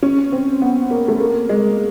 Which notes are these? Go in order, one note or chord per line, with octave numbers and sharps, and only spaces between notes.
C#4
C4
B3
A#3
A3
A#3
G#3